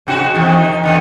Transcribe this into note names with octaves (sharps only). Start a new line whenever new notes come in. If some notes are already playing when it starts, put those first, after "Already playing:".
G#2 C3 F#4
E2 C3 D#3
D#4
E2 D3 B3